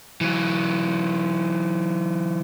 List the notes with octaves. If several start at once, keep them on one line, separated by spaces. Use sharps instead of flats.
E3 F#3